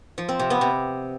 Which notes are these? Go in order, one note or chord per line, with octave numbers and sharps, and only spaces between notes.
F3
C4
C3
B3
C3